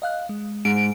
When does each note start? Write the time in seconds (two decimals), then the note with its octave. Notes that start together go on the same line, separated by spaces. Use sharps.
0.02 D#5 F5 F#6
0.29 G#3
0.65 G#2 D7